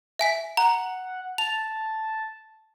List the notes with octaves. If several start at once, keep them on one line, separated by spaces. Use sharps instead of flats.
E5 G#5 B6
F#5 A#5
A5 F7